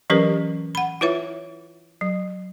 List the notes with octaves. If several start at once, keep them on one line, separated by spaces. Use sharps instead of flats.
E3 F#3 C#4 G4 A#4 B4
F#5 B5
E4 F4 B4 C#5 E5
F#3